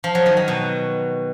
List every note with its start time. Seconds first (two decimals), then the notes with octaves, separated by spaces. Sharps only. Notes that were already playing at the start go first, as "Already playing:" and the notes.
0.04 F3
0.15 F#3
0.26 D#3
0.37 D#3
0.48 B2